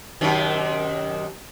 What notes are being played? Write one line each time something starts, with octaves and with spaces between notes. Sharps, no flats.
F#2 C3 D#3